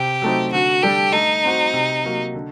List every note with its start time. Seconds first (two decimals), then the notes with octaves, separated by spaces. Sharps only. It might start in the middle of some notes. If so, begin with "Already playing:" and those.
Already playing: C3 G4
0.22 F#3 A3 C4 D#4
0.52 D3 F#4
0.83 G3 D4 G4 A4
1.13 A3 D#4
1.44 C4 F#4
1.73 C3
2.04 F#3 A#3 F#4
2.34 D3